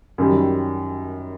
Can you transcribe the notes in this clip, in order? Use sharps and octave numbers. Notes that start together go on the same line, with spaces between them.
F#2 D#3 G3